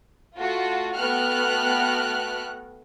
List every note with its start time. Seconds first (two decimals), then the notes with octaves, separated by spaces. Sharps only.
0.36 A3 F4 F#4
0.95 A3 B3 F#4 G5 F6 F#6